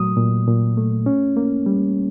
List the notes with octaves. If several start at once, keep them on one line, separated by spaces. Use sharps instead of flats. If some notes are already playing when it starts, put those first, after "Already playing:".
Already playing: A#2 F#3 A3 D#6
A#2
A#2
A3
C#4
A#3
G3